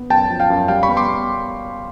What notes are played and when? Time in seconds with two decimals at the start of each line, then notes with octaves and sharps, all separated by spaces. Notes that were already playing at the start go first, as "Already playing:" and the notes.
Already playing: B3
0.10 F#2 G5 A5
0.30 F3
0.40 F5 G5
0.50 F#2
0.68 G3 F5 G5
0.83 B5 C#6
0.88 B3
0.97 C6 D6
1.08 B3